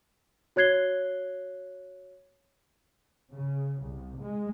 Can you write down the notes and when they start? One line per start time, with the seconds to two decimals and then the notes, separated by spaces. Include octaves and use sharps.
0.56 F#4 C#5 F#6 G#6 C7 G7
3.31 C#3
3.82 C2
4.21 G#3